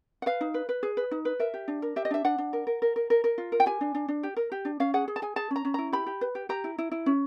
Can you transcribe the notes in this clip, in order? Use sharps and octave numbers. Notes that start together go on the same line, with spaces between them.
F#5
B4 F5
D#4
B4
B4
G#4
B4
D#4
B4
A#4 E5
G4
D4
A#4
G4 E5
D#5
D4 E5
D4 F#5
D4
A#4
A#4
A#4
A#4
A#4
A#4
F4
A#4
G5
G4 G#5
D4
D4
D4
G4
A#4
G4
D4
C#4 F5
G#4 F#5
G#4
A5
G#4 G#5
G#4 A5
C#4
A#5
C#4
E4 A#5
G4 B5
G4
B4
G4
G4 A#5
E4
E4
E4
C#4